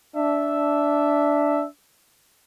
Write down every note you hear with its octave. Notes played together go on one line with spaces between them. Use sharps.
D4 E5